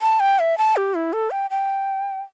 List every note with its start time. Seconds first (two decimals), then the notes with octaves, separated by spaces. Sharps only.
0.02 A5
0.20 G5
0.39 E5
0.58 A5
0.76 G4
0.95 E4
1.13 A4
1.31 G5
1.50 G5